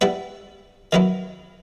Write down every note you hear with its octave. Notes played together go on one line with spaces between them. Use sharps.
G3 B3 E4 B4 E5
D#3 F#3 B3 E4